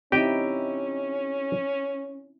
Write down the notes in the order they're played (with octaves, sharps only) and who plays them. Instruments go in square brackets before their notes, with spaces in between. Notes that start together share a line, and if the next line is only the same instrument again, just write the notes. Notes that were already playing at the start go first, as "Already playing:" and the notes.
[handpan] C4 D#4 E4 [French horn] C#4 [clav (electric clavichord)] G4 D#5 G5